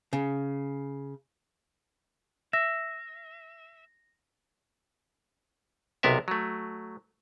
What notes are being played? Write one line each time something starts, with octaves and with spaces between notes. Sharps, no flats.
C#3
E5 A#6
B1 C3 B3 A#4 E5
F#3 A3